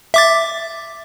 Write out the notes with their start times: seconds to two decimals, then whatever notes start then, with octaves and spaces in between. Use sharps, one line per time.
0.14 E5 D6 A6